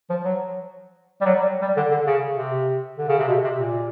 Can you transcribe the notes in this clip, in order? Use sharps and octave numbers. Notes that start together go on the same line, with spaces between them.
F3
F#3
G3
F#3
G3
G3
D3
D3
C#3
C3
D3
C#3
C3
B2
C3
A#2